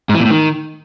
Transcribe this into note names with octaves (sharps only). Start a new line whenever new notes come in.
G#2
E3
A#2
A2
D#3